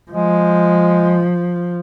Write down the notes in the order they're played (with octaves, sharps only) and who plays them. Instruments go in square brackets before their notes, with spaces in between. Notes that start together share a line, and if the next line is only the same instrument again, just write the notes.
[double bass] F3 [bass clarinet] G#3